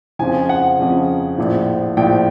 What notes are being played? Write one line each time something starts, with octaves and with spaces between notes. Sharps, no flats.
F2 C#3 F3 G#5
F#5
F2 C#3 F3
A#1 A2 F3
A#1 A2 F3 G5